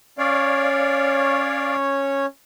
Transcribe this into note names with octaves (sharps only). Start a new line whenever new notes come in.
C#4 C#5 D5 F5